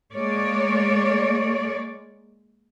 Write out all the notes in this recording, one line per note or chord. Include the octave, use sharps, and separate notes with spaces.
G#3 A#3 C#5 D5